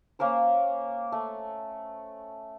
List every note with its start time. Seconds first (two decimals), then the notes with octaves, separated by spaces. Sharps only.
0.19 A#3 C#4 A#4 C5
1.12 A3